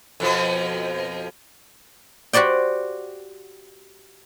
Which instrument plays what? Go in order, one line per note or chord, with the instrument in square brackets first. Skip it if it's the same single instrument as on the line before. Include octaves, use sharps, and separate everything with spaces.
[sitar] F2 B2 F3
[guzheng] F#4 G4 C5 D5 G5